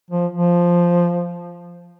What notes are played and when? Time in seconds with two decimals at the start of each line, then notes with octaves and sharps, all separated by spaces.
0.10 F3
0.32 F3